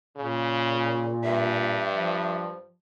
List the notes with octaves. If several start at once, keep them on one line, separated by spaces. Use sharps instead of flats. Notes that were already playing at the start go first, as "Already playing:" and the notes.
A#2 C#3
G2 E5
F3